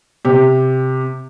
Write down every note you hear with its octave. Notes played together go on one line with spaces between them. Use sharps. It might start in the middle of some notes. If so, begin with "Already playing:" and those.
C3 G4